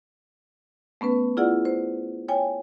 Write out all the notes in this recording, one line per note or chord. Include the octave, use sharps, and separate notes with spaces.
A3 B3 C#4 B4
E4 F4 G#4 D5 F#5
C5
C#5 G5 G#5